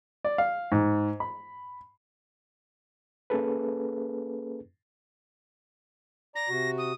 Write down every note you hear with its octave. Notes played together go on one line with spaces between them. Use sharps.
D5
F5
G#2
B5
A#3 C#4 G#4 A4 B4
D5 A#5 A#6
C3 F#4
D#6